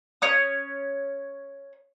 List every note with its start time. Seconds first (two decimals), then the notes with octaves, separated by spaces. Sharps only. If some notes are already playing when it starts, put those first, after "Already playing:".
0.22 C#4 C#5 D#6